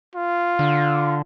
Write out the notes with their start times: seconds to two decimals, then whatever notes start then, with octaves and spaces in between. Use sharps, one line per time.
0.15 F4
0.59 D3